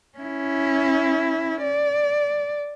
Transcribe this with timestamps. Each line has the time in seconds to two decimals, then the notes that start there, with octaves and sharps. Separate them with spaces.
0.18 C#4 E4
1.63 D5